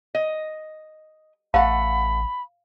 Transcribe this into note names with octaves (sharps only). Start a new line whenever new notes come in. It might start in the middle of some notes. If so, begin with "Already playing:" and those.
D#5
A1 A3 F5 F#5 B5